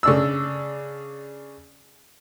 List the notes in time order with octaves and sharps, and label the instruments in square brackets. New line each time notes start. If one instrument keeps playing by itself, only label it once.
[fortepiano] C#3 D4 E6